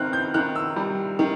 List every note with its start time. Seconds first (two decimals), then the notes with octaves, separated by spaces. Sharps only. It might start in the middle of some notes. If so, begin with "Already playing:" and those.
Already playing: D#3 C4 F6 F#6
0.13 G6
0.34 D#3 F#6
0.56 E6
0.76 G3
1.19 D#3